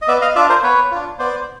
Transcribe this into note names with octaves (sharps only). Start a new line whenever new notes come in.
D#5
B3 D5 E5
D#5 F5
D4 F4 D5 E5
A#4 C5
B3 B4 C#5
D4 F4
B3 C5 D5